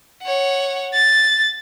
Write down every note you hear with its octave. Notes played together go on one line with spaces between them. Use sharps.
C#5 F#5
A6